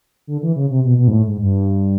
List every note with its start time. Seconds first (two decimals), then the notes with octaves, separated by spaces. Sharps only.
0.27 D3
0.42 E3
0.56 C#3
0.70 C3
0.84 B2
0.98 B2
1.08 G#2
1.12 A2
1.27 G#2
1.41 G2